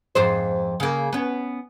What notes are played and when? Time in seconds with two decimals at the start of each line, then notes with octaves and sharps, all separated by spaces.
0.15 F2 G#2 C5
0.80 C#3 A#3
1.13 B3 C#4